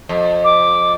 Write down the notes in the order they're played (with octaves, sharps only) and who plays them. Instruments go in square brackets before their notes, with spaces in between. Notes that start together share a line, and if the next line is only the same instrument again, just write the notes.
[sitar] F2
[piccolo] D6